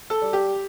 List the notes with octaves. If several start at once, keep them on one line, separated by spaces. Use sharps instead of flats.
A4
G3
G4